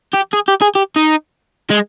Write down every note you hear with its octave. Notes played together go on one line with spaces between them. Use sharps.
G4
G#4
G4
G#4
G4
D#4
G#3